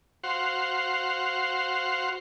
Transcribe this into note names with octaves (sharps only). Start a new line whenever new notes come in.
F#4 C5 F5 F#5 C6